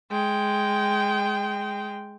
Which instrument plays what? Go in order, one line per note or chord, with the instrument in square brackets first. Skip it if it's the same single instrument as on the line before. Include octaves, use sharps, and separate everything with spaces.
[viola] G#3 G5